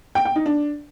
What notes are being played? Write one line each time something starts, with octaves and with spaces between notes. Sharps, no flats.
G5
G5
D#4
D4